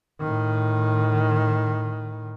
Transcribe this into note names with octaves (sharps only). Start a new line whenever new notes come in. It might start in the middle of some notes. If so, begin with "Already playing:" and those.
A2 D#3